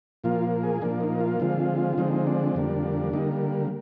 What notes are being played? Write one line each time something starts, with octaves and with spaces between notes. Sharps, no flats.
A#2 F3 A#3 F4
G#4
A#2 F3 A#3 D4
D#4
F4
D3 F3 G#3 C4
D3 F3 G#3 C4 D#4
D4
F2 D3 G3 A#3
D3 G3 A#3 D#4